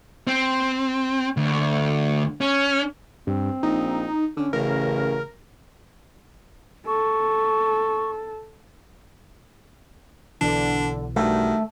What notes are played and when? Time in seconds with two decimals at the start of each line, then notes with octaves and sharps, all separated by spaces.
0.27 C4
1.37 D2
2.41 C#4
3.27 G2 C4
3.63 A#1 D#4
4.37 D3 C#4
4.53 A1 C#3 A#4
6.87 A4 C#6
10.41 B1 B2 D3 E3 D4
11.16 G2 D#3 A3 F#4